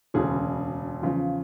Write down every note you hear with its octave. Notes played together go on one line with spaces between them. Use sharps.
E1 D2 C#3 G#4
E2 C#3 F3